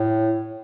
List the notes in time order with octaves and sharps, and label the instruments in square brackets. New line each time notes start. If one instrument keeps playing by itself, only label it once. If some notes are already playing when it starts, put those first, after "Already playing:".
Already playing: [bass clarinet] A2